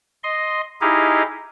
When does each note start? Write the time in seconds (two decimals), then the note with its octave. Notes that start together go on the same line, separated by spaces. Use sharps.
0.23 D#5 C6
0.81 D#4 E4 G4 G#4 D#5 F5